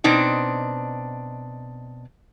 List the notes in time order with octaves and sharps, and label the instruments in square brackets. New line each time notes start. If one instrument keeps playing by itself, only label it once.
[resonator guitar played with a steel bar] B2 C4 D4 D#4